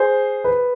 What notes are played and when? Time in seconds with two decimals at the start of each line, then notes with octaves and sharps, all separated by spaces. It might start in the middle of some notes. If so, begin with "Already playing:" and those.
Already playing: G#4 C5
0.44 B4